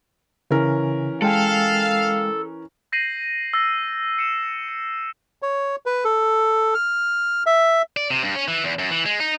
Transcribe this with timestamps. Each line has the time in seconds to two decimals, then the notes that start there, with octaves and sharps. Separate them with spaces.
0.51 C#3 E3 C#4 A#4
1.22 G#3 A4 F5 G5 G#5
2.92 G6 A#6 C7 D#7 F#7
3.54 E6 A6 A#6
4.18 C7 C#7 D#7 E7
4.68 C#7
5.42 C#5
5.86 B4
6.05 A4
6.74 F6
7.46 E5
7.97 D5
8.10 C3
8.23 G2
8.35 C#4
8.48 E3
8.64 E2
8.79 F#2
8.91 E3
9.06 G#3
9.20 D#4